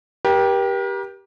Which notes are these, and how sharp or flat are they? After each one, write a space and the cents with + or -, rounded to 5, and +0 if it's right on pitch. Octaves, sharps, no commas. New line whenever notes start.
G4 +0 A#4 +40